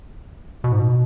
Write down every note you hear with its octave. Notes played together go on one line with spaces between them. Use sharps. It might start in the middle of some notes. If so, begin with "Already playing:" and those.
B2
G#2
B2